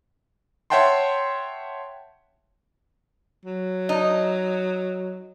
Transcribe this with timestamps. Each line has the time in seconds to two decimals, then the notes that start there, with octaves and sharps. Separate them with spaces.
0.70 C#5 E5 F#5 G5 A5 C6
3.46 F#3
3.89 D#4